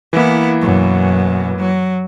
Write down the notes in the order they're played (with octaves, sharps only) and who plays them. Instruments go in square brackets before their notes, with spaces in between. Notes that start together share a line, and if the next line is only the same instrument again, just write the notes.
[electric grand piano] E3 A#3 [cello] B3 E4
[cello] F#2 B2
F#3